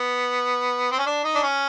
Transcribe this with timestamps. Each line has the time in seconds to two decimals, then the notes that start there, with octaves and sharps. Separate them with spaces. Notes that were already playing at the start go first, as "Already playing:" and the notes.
Already playing: B3
0.91 C4
0.99 C#4
1.06 D4
1.24 D#4
1.35 D4
1.43 C#4